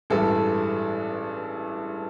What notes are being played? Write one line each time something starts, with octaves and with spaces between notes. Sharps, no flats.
A1 G2 E3 G#3 A4